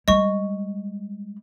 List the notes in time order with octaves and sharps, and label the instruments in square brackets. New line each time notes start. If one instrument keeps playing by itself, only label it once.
[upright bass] G3 G#3 [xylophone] D#5 C#6